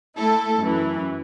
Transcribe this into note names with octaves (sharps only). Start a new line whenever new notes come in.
A3 E4 A4
F#2 E3